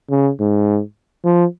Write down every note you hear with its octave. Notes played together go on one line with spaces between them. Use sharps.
C#3
G#2
F3